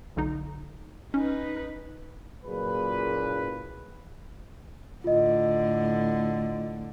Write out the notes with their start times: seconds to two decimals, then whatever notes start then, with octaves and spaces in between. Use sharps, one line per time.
0.16 B1 D3 D#4
1.14 C#4 D#4 B4
2.45 F#1 A#2 G#4 B4
5.04 A2 D3 F4 D#5